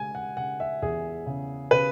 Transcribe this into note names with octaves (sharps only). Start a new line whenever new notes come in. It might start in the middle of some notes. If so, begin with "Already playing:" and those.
Already playing: C#3 G#3 G#5
F#5
C#3 F#5
E5
E2 G#4
C#3
C#3 B4